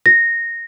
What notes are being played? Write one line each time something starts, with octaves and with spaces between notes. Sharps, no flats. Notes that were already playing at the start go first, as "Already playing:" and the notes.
A#6